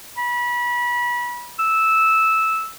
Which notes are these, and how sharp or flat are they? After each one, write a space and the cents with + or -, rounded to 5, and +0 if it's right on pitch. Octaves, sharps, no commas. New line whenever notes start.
B5 -30
E6 -10